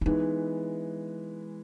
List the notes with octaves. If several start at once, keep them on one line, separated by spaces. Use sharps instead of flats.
E4
E3 G#3 B3 D#4